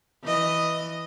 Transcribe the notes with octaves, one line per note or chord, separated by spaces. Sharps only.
E3 D#5